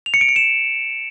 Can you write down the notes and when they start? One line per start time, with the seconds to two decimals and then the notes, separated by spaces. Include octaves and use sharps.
0.06 F7
0.14 C#7
0.21 D7
0.29 C#7
0.36 E7